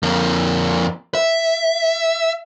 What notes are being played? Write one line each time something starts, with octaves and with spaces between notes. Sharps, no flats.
F2 A#3
E5